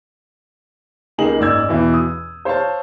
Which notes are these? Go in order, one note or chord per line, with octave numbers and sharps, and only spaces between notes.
C#2 A#3 D#4 G#4 F#7
F#1 G#2 D5 E6 G#6
E2 B2 E3
D#6
C5 C#5 F5 A5